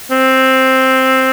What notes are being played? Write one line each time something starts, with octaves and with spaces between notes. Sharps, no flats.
C4